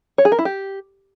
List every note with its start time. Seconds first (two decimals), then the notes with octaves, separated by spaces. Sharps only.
0.18 C#5
0.25 G#4
0.32 A#4
0.39 E4
0.45 G4